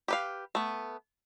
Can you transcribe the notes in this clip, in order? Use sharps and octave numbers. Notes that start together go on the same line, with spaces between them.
G4 B4 F5
A3 B3